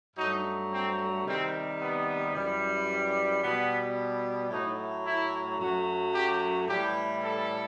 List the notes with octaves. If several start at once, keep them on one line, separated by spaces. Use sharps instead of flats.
G2 F#3 A3 D#4
C4
C3 D#3 G3 C4
B3
F#2 E3 G3
B2 G3 B3
A2 F#3 A3 D#4
E4
F#2 F#3 A3 F#4
G4
A2 E3 G3 G4
A4